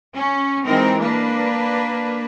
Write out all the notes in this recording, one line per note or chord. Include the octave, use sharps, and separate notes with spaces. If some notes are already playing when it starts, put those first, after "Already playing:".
C#4
E3 G#3 C4 D#4 A#4
A#3 D4 B4